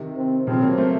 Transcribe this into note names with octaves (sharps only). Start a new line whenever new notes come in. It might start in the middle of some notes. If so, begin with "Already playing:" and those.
Already playing: C3 D#3
C4
C#3 F3 C4
F#3 A#3
A3 C4